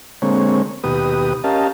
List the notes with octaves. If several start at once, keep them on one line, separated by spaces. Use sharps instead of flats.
D3 G#3 A#3 C4 C#5
D#2 B2 G4 B4 D#6
C#4 G4 A#4 D#5 F5 A5